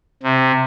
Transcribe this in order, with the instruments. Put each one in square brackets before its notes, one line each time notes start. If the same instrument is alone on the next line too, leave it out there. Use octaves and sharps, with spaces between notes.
[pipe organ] C3